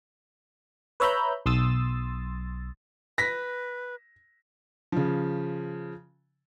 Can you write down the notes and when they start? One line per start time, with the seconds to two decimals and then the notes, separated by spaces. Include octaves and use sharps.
1.00 B4 C#5 E5 A#5 B5 G6
1.46 B1 C6 D#6 E6 A6
3.18 B4 A#6 B6
4.92 C#3 F3